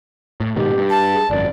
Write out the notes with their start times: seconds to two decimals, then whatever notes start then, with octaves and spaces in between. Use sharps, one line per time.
0.40 A2
0.56 G#2 B2 D#3 G4
0.73 G2
0.90 A5
1.15 G#4
1.30 G#1 F#2 D5